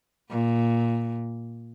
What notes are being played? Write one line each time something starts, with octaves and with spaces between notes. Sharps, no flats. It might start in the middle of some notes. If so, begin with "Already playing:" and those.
A#2